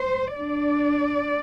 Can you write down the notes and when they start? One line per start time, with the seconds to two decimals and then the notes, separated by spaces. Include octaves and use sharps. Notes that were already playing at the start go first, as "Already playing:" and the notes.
Already playing: C5
0.36 D4 D5